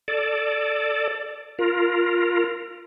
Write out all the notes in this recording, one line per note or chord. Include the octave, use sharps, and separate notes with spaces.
A4 D5
F4 A#4